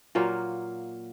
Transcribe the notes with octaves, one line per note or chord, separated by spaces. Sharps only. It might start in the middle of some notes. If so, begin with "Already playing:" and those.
A#2 F#3 A#3 F4